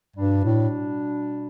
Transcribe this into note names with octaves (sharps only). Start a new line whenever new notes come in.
G2 B2 G3 D4
A2